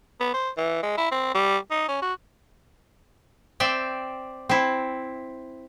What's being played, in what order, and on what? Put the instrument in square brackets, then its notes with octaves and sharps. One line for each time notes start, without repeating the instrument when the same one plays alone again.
[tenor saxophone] B3
C5
E3
G#3
E4
C4
G3
D#4
C#4
F#4
[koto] C4 D5 E5 G5
C4 E4